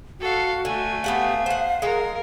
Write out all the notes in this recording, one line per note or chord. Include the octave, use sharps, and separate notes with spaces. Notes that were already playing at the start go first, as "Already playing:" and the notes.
F#4 A4 F5
D3 A3 G#5
B3 G4 F5 F#5
C5 F#5
G#3 A#4